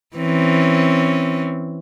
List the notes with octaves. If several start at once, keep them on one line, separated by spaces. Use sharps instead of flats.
E3 C4 C#4